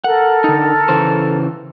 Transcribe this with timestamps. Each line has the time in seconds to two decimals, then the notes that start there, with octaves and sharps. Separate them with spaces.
0.04 A4 A#4 F#5
0.44 D3 D#4
0.89 C#3 E3 C5